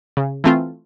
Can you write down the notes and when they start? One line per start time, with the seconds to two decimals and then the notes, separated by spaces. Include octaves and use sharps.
0.17 C#3
0.44 E3 A3 C4 F4